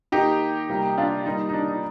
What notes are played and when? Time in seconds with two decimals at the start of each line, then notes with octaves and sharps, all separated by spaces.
0.12 D#3 A#3 D#4 G4
0.69 C3 G3 A#3
0.98 D4 F4
1.25 D#3 G3 A#3 D#4
1.49 D#4
1.53 D4
1.68 D#4